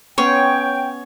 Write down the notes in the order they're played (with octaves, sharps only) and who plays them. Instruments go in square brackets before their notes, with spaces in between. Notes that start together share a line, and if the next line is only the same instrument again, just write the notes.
[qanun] B3 C#4 C6 [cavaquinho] C#5 [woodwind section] G5